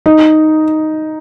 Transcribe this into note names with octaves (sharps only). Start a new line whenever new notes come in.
D#4